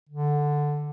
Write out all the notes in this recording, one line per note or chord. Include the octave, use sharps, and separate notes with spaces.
D3